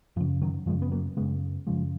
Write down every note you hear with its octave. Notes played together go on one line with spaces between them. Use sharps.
F#2 C#3 F3
D#3 F#3
F#2 C#3 F3 G#3
B3
F#3 A#3
F#2 C#3 G#3 B3
F#2 C#3 F3 G#3